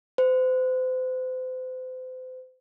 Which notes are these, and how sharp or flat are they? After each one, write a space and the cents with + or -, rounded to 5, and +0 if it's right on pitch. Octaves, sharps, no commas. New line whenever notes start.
C5 -35